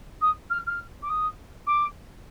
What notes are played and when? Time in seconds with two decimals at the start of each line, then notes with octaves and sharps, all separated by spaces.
0.21 D#6
0.50 F6
0.66 F6
1.02 D6
1.09 D#6
1.66 D6